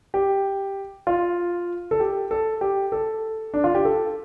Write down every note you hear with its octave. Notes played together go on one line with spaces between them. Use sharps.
G4
F4
A4
G4
A4
G4
A4
D4
F4
G4
A4